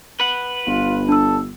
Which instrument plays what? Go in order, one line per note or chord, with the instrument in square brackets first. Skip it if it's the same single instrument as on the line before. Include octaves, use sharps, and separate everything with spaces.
[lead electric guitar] B4 F#5
[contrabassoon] G1 [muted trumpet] F4
[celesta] D4 E6 [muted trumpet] A4